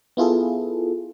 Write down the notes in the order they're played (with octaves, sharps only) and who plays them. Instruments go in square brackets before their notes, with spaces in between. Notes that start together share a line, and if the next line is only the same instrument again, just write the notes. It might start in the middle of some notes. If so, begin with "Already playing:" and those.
[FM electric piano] B3 E4 F4 G#4 A4